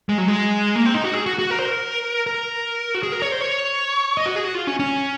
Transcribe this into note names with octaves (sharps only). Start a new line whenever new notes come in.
G#3
F#3
G#3
A#3
C4
D#4
F#4
G#4
F#4
F#4
A#4
C5
A#4
A#4
F#4
G#4
A#4
C#5
C5
C#5
D#5
F#4
G#4
F#4
F4
C#4
C#4